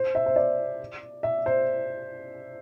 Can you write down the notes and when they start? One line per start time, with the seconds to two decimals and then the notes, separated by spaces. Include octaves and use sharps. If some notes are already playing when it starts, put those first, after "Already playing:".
Already playing: C5
0.15 E5
0.26 C5
0.36 D5
1.23 E5
1.46 C5